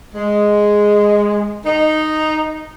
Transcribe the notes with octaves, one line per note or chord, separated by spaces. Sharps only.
G#3
D#4